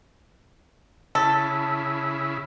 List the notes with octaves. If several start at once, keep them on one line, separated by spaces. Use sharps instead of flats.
C#3 E4 A4